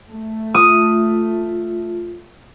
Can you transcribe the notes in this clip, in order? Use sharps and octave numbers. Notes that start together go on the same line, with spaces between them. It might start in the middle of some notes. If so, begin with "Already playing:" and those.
A3
F4 D#6